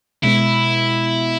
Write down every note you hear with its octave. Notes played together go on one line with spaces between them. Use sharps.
B2 G#3 B3 E4